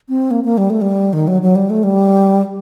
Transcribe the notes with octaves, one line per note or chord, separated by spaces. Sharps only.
C4
A#3
A#3
G3
A3
G3
D#3
F#3
F#3
G3
A3
G3